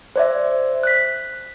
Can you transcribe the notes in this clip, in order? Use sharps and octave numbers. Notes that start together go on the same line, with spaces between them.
C5 D5 E5
F#6 B6